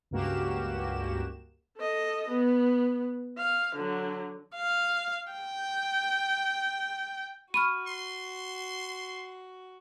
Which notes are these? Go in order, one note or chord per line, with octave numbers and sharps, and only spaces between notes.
C#2 G2 A#3 F#4 G4 E7
A4 D#5
B3
F5
D3 F#3
F5
G5
F#4 B5 C#6 F6 D#7
C6